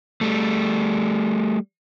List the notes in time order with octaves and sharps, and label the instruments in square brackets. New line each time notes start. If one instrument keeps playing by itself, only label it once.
[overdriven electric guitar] G3 A3